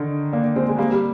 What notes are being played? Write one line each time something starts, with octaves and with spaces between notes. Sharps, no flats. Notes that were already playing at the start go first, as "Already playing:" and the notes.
Already playing: D3 D#3
A#3 D4
G#3 C4
G#3
G3 A#3
G3